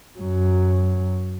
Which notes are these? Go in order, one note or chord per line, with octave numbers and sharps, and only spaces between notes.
F#2 F#3